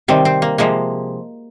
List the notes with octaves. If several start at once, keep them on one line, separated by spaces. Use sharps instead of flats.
C3 D#3 G3 C4
C4
A#3
C3 F3 G#3 A#3